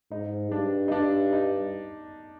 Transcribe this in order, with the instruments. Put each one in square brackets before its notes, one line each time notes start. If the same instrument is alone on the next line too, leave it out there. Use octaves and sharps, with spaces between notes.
[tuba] G#2 [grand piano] D#4
[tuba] G2 [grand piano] D4
[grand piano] D#4
[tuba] G2 [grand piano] D4
[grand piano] D#4